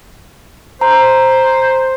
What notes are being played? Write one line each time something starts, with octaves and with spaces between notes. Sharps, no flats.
C5 A#5